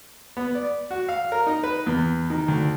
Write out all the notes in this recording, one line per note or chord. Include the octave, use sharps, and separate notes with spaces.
B3
D5
F#4
F5
A#4
D#4
B4
E2
D#3
D2